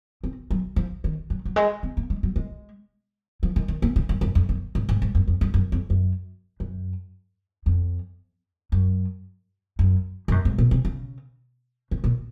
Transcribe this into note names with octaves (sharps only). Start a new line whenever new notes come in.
C4
F#3
F3
D#3
F#3
F#3
G#3
C4
A#3
G#3
F#3
G#3
F3
D#3
D#3
A#3
C#3
F#2
F#2
F2
F#2
G#2
G#2
G#2
F#2
F2
F#2
F#2
F2
F#2
F#2
F2
F#2
F#2
G#2
F#2
G#2
A#2
C3
C#3
C#3
A#2